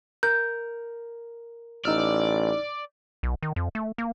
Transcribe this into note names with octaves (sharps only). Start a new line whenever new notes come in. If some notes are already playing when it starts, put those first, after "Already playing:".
A#4 G6
A1 D#4 D5 E6 F6
B1
D#3
F2
A3
A#3